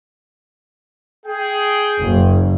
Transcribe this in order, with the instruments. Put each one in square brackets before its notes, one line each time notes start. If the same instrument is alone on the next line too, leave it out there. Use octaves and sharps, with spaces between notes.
[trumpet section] G#4 G5
[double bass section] F#1